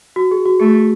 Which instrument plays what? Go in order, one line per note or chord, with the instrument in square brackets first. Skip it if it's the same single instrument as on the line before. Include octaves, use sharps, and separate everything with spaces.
[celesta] F#4
G#4
F#4
[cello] A3 [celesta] G#4